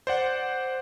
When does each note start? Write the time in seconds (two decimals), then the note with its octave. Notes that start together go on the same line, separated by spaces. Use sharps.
0.07 C5 D5 F#5